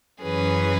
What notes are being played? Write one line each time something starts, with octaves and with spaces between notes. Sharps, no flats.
F#2 E3 C#4 G#4 B4